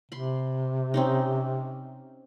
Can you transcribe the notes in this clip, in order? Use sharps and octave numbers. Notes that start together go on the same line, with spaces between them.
C3 B5 C6
C4 C#4 D#4